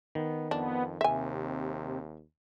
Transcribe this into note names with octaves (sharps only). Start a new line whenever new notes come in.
D#3 B3
F2 B3 D4
D#2 C3 E5 G#5